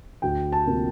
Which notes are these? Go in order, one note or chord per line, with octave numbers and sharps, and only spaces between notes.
D2 G5
A5
C3 F3 A#3